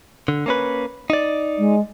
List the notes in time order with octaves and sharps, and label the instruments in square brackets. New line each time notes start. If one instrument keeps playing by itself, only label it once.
[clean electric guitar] D3
A#3 C#4 B4
D#4 D5
[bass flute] G#3